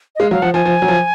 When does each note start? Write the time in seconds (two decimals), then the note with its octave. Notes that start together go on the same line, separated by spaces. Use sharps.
0.16 D#5
0.20 G#3 F5
0.31 F#3 F5
0.42 F3 F#5
0.54 F3 G#5
0.65 F3
0.82 F#3
0.88 F3